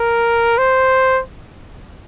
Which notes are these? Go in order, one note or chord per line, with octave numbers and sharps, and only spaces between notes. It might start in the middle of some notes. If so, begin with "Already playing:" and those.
Already playing: A#4
C5